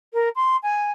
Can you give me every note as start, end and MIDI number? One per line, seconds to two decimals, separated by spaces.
0.13 0.29 70
0.36 0.56 84
0.63 0.91 80